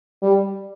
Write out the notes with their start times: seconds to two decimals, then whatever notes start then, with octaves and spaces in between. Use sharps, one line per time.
0.23 G3